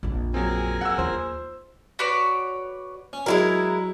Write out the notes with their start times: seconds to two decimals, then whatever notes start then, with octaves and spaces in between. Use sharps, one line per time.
0.03 A#1 F2
0.34 F#3 C4 G#4 A#4 G#5
0.81 F#5 E6
0.98 D#2 F4 C5
1.99 F#4 B4 C#5 D5
3.13 C#4
3.26 F#3 G#3 E4 A#4